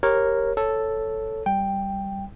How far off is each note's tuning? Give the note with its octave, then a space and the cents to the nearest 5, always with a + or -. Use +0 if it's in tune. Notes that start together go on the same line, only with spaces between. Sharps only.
G4 +0 A#4 +0 C#5 -15
A4 +0 C#5 +0
G3 -5 G5 +5